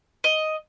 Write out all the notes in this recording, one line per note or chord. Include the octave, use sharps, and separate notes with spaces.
D#5